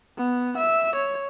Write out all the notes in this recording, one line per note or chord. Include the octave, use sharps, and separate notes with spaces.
B3
E5
C#5